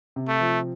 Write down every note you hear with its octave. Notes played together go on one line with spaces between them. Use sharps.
C3
A3
F3